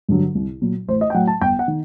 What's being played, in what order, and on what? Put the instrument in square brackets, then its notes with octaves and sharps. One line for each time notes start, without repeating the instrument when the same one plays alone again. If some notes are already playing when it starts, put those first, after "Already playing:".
[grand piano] G2 D3 F#3
C2
A#2 F#3
A1 C5
D#5
G5
A2 F#3 F#5
A5
G1 G5
F#5
D#3